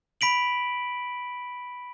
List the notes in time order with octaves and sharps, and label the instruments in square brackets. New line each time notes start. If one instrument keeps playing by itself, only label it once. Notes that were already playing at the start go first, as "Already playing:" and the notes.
[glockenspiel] B5 B6 D7 F#7